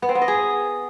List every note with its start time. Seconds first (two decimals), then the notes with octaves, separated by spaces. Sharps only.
0.02 B3
0.09 C4
0.15 B3
0.22 D#5
0.28 G#4